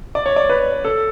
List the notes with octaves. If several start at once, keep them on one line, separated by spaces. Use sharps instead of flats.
D5
C#5
D5
B4
A4